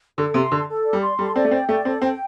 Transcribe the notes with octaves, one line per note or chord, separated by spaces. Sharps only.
D3 A4
C3 C6
D3 A4
A4
D5
G3
C6
G3 A4
C4 D5
A3
C4 G5
A3 D5
C4 A4
C4 G5